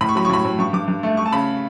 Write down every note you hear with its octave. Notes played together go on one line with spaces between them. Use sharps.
A2 B5
C#6
F#3 B5
C#6
A2 B5
A2
G2 C#6
G2 D6
G2
A3
A3 C#6
A5
C#3 B5